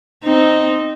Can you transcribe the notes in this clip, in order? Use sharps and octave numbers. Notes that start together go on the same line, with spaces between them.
C4 D#4